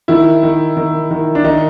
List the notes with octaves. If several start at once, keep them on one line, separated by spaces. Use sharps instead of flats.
D#3 E4
D#3
D#3
D#3
D4
D#3 D#4